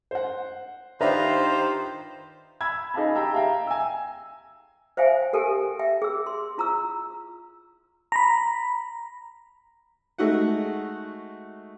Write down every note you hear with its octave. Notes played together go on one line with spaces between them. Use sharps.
C5 F#5
D#3 D4 F4 G4 B4 C5 E5 A#5
B5 E6 G#6
D#4 G#4 D#5 F5 A5 B5
G4 G5 A5 A#5 E6
E5 F5 G5 A#5
G#5 E6
C5 E5 F5 G5 G#5
G4 A4 A#4 G5 G#5
E5 G5
G#4 E6
C6
E4 F4 A#5 C#6 E6
A#5 B5
G#3 A3 D#4 F#4 F#5